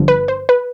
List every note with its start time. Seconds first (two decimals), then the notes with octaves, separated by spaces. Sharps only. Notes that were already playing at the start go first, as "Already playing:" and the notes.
Already playing: G1 G2 D3 F3
0.08 B4
0.28 C5
0.49 B4